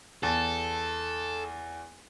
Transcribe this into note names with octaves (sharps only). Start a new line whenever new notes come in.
E2 A4 A5 A6